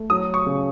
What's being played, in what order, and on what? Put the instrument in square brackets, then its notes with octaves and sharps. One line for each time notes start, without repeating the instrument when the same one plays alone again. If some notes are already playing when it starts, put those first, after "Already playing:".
Already playing: [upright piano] A3
[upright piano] F#3 [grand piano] D#6
[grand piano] C#6
[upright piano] C#3